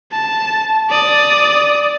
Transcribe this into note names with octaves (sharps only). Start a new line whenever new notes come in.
A5
D5 D#6